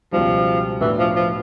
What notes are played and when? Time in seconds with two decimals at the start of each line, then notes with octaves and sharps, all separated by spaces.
0.12 C#2 B2 F3 G3
0.81 A2 E3 F#3 B3 D4
0.99 F3
1.16 F3